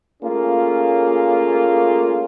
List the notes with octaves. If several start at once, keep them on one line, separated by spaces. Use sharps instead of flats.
A3 A#3 C#4 F4 G#4